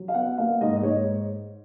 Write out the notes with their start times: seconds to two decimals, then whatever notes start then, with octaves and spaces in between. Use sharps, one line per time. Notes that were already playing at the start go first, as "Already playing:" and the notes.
Already playing: F#3
0.08 F5
0.14 B3 F#5
0.38 A#3 F5
0.61 G#2 D#5
0.76 D#5
0.83 G#2 C#5